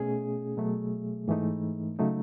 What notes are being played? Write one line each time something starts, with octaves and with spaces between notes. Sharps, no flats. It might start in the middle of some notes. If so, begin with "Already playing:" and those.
Already playing: B2 A3 C#4 G#4
B2 F#3 A3
G#2 E3 A3 D#4
C#3 F#3 A3 D#4